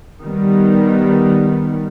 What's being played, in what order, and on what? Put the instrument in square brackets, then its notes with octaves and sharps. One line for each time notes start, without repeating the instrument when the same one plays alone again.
[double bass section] D#3 G3 B3